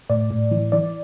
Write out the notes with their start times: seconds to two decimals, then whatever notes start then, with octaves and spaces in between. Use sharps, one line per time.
0.10 A2 D5
0.31 A2
0.51 E3
0.72 E3 D5